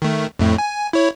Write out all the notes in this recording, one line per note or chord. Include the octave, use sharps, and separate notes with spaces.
D#3 A3
F2 A2 A3
G#5
E4 C#5